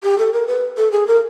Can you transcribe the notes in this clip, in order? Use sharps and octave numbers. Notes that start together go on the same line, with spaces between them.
G4
A4
A#4
B4
A4
G#4
A#4